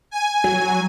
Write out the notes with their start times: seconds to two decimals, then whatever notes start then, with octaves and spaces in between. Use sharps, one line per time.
0.11 G#5
0.44 F#3